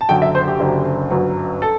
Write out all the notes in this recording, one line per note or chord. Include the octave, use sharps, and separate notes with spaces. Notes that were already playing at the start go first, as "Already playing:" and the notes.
A5
F#1 F#2 D3 F#3 G5
E5
C5
G4
F#1 F#2 D3 F#3
G1 F#2 F#3
A4